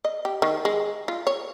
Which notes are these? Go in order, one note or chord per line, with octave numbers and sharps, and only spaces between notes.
D#5
G4
D#3
G#3
F4
C#5